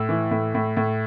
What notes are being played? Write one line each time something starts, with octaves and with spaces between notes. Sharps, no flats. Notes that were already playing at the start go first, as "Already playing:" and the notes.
Already playing: A2 E6
E3
A2
A2
A2